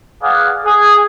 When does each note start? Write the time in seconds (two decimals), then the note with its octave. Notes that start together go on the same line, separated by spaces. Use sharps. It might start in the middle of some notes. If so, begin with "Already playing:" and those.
0.23 G#4 B4 D5 F5 F#5
0.65 G#4